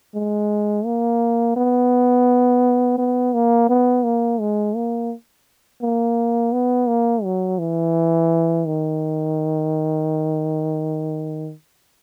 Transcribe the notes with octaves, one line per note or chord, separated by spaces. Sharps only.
G#3
A#3
B3
B3
A#3
B3
A#3
G#3
A#3
A#3
B3
A#3
F#3
E3
D#3